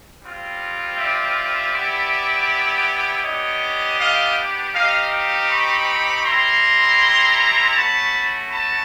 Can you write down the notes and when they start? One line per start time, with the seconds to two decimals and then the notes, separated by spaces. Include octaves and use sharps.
0.22 G3 C4 F4
0.97 D5 E5
1.73 B3 E4 G4
3.23 B3 D4 G4 C#5 D#5
3.98 D#5 F5
4.74 C4 D#4 G4 D#5 F5
5.12 F5 G5
5.49 B5 C#6
6.24 G3 C4 E4 A#5 C6
7.75 A3 C#4 F#4 A5 B5
8.51 A5 B5